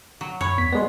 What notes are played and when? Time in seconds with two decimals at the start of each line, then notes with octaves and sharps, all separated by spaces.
0.21 F#3
0.41 F#2 C#5 B5 C#6
0.58 E2 B3 B6
0.73 G#3 B3 D5 D#5 C6